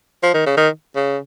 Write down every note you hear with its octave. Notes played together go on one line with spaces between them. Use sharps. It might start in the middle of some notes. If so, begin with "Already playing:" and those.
F3
D#3
C#3
D#3
C#3